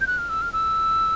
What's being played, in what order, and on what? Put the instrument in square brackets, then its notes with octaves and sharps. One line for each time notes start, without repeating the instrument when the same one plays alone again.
[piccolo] G6
F#6
F6
E6
F6
E6